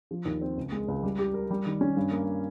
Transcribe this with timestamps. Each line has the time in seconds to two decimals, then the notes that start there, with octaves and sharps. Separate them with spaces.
0.11 F3
0.25 D#2
0.41 C4
0.57 C#2
0.72 G#3
0.88 C#2
1.03 G3
1.18 G4
1.34 A#4
1.51 G3
1.66 D#3
1.81 C#4
1.97 G2
2.11 A#3